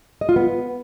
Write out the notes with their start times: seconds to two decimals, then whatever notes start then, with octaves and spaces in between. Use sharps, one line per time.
0.21 D#5
0.29 F4
0.36 B3